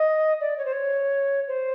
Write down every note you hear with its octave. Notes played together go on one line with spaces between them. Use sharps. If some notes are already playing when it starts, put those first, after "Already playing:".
Already playing: D#5
D5
C#5
C5
C#5
C5